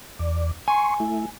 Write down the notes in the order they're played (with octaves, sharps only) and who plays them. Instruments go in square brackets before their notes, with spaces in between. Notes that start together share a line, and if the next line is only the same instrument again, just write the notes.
[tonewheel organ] E2 D5
[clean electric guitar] G#5 [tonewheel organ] C6 C#6
[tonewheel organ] A3 E4